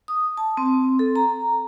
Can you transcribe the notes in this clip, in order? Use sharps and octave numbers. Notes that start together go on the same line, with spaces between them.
D#6
A5
C4
A4
A#5